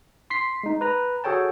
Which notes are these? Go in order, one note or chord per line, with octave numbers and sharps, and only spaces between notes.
C6 B6 C7
G#3 D#4
B4 A#5
F#4 G#4 A4 C#5 G5 A5